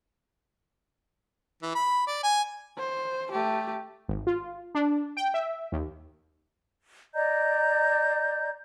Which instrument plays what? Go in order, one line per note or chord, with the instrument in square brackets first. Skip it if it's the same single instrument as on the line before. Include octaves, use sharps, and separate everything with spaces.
[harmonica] E3
B5
D5
G#5
[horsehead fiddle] C5
A3 G4
[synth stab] G#1
F4
D4
G5
E5
D#2
[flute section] D5 D#5 A#5 G6